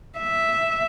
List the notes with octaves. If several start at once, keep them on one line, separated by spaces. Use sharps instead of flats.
E5